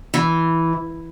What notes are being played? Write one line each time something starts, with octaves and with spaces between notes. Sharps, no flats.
E3